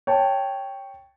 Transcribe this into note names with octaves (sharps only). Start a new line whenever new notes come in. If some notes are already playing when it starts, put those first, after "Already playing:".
C#5 G5 A5